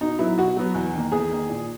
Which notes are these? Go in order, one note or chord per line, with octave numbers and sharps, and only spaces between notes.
B2 D#4
F#3 B3 E4
B2 F#4
F#3 B3
E2
D#3 A#3
E2 G#4
D#3 A#3
A#2